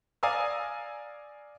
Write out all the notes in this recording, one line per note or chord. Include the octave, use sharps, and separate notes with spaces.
D5 F5 G#5 A#5 D#6 E6